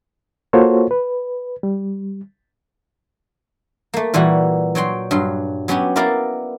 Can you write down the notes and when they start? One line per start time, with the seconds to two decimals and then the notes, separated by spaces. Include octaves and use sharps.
0.53 A#3 F4 F#4 A4 C5 C#5
0.91 B4
1.63 G3
3.94 A3 A#3
4.14 A#2 E3 G3 F#4
4.75 F#3 C#5 G5 C6
5.11 G2 F#3 C6
5.68 F#3 B3 C#4 F#4 G4
5.96 A#3 B3 E4 A#4 D5 F5